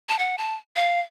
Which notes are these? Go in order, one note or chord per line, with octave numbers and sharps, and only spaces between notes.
A5
F#5
A5
F5